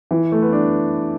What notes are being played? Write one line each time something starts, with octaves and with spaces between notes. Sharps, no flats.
E3
A3
B3
D4